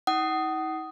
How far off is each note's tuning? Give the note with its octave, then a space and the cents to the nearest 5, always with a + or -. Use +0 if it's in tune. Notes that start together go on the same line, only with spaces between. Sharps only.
D#4 +45 F#5 +35 D#6 +0